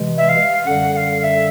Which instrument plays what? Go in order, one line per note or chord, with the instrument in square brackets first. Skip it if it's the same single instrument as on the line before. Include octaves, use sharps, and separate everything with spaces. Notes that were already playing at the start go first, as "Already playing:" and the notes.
Already playing: [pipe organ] C3 E3 G#3
[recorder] E5
F5
[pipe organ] F#2 D3 G3 [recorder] F#5
[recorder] F#5
F5
F5
E5